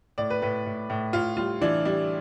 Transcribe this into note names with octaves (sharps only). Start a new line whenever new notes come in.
A2 D5
B4
A2 B4
A2
A2
A2 F4
G3 F4
E3 D4
G3 D4